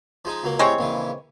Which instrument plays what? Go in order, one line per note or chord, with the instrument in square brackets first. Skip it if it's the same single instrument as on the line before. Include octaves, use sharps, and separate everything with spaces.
[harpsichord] F3 G#3 D#4
C#2 F#3 A#3
[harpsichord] A2 A3 G4 [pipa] G#3 C4 C#5
[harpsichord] A#1 C#3 E3